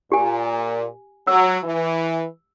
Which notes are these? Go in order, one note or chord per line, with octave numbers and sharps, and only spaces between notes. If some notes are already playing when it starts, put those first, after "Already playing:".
A#2 G4 G#5
F#3 E6
E3